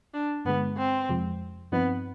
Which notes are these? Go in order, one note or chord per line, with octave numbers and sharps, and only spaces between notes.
D4
G2 D3 G#3 B3
C4
F2 C3 F3 G#3
G2 F3 B3 C4 D#4